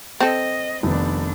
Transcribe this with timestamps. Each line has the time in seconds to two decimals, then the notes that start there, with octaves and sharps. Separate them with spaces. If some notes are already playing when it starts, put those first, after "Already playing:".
0.20 C4 A4 D#5
0.83 F1 D#3 G3 B3 D4